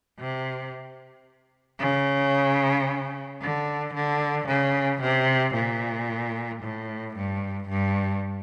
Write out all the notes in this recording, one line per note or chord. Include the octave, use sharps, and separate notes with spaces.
C3
C#3
D3
D3
C#3
C3
A#2
A2
G2
G2